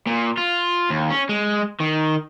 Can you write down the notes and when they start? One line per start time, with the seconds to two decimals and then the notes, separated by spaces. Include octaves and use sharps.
0.07 A#2
0.38 F4
0.90 D#2
1.10 C#4
1.29 G#3
1.80 D#3